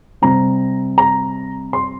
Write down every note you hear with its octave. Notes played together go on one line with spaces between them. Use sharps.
C3 G3 C4 A#5
A#5
C6